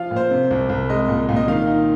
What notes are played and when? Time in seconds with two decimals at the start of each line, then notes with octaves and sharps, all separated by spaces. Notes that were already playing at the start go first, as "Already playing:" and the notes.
Already playing: F3 F4 F5
0.11 A#2
0.16 C5
0.31 C3
0.51 C2
0.69 C2
0.89 G#3 D#5
1.08 A#2
1.29 A#2
1.36 D#5
1.48 D#3 F5
1.67 D#4